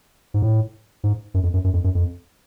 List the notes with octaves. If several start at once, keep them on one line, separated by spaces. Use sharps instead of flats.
G#2
A2
G#2
F#2
F2
F#2
F#2
F2
F#2
F2